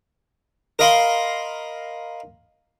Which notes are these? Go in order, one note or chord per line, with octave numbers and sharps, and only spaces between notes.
A#4 D#5 F5 B5 C6